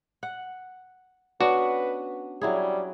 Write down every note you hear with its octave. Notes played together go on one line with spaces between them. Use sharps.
F#5
B3 C#4 D4 F#4 B4
F#3 G3 E4 G#4